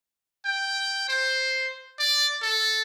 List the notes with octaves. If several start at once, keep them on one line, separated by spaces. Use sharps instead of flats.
G5
C5
D5
A4